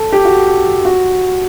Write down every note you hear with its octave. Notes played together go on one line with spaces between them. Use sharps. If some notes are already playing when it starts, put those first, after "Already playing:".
Already playing: A4
G4
F#4
F#4